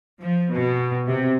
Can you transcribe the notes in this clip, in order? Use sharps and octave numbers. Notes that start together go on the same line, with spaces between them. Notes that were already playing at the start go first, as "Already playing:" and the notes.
F3
B2
C3